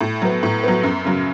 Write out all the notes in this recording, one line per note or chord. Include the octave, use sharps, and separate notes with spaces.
A2
F#3 B3
A2
F#3 B3
F#2
C#3 F#3